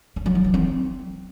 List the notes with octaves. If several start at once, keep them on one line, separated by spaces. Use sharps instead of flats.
C#4
F#3
D#4
E3
C4